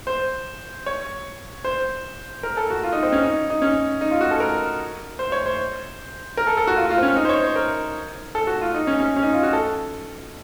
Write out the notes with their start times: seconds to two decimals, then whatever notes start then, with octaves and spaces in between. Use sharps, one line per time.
0.07 C5
0.86 C#5
1.65 C5
2.43 A#4
2.57 A4
2.70 F#4
2.84 F4
2.93 D#4
3.03 C4
3.12 C#4
3.22 D#4
3.50 D#4
3.62 C#4
4.01 D#4
4.11 F4
4.21 F#4
4.31 A4
4.40 A#4
5.19 C5
5.32 C#5
5.46 C5
6.37 A#4
6.47 A4
6.57 A4
6.67 F#4
6.77 F4
6.86 F#4
6.90 F4
6.98 C4
7.03 C#4
7.16 D#4
7.25 C5
7.29 C#5
7.44 C5
7.56 A#4
8.35 A4
8.47 F#4
8.61 F4
8.74 D#4
8.87 C#4
9.00 C#4
9.17 C#4
9.23 D#4
9.33 F4
9.43 F#4
9.53 A4